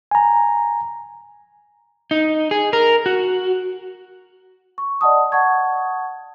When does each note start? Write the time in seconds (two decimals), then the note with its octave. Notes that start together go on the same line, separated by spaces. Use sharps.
0.11 G#5 A#5
2.11 D#4
2.51 G#4
2.73 A#4
3.06 F#4
4.78 C#6
5.01 D5 D#5 F#5 A5 D#6
5.32 F#5 A5 C#6 G#6